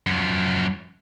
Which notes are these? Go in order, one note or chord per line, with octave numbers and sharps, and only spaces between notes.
F#2 F3